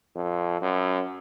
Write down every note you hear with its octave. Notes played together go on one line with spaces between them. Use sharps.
F2
F#2